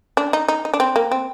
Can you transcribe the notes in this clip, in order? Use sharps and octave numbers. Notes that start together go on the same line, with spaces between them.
D4
D#4
D#4
D#4
D4
C4
A#3
C4